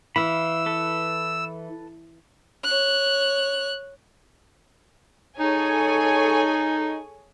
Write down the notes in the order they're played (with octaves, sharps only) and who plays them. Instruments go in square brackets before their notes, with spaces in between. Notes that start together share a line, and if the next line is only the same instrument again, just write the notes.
[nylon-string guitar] E3 [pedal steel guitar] E5 F5 B5 [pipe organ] E6
[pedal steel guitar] A4 B4
[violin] C#5 F#6
[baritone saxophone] D#4 [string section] G#4 C#5 G#5 [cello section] A4